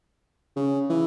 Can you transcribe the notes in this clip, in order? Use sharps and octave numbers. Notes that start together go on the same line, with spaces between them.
C#3
E3